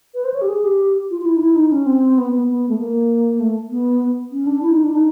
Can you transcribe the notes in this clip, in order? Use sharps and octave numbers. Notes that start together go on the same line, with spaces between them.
B4
C5
C#5
G4
G#4
G4
F4
F4
E4
D#4
E4
D#4
C#4
C4
B3
B3
B3
A3
A#3
A3
B3
C#4
D4
E4
D#4
D4
D#4